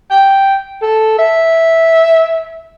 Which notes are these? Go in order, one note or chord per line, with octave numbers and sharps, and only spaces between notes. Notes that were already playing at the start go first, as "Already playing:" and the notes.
G5
A4
E5